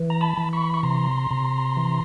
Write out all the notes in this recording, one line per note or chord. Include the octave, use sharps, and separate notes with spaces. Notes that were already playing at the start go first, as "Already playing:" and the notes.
Already playing: E3
A#5
A5 B5
E3
B5 C#6
C#6
C3 A#5 C6
C3
E3